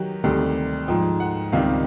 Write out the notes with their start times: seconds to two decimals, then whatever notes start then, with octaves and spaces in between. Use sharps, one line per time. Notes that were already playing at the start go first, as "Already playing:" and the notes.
Already playing: D#3 F#3 G4
0.24 D2 C3 D#3 G3
0.88 G#2 F3 G5
1.20 F#5
1.52 C#2 C3 D#3 G3 F5